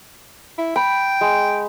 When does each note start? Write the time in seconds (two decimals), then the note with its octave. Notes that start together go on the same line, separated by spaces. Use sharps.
0.58 E4
0.76 G5 B5
1.21 G#3